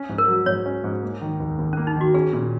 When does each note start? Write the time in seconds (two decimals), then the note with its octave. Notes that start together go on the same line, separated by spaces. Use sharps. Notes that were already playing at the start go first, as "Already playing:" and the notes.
Already playing: C#4
0.09 G#2
0.18 A#4
0.28 F#3
0.46 G#2 C#5
0.66 C#4
0.84 G#2
1.03 A#3
1.21 D#3
1.40 D#2
1.58 D#2
1.73 A#3 C#4
1.87 D#4
1.96 D#3 F#4
2.14 C#4 G#4
2.33 A#2